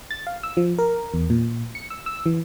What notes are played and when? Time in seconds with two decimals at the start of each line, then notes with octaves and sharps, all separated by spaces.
0.11 A6
0.27 F5
0.43 E6
0.57 F3
0.78 A#4
1.14 E2
1.30 A#2
1.75 C#7
1.90 E6
2.06 E6
2.26 E3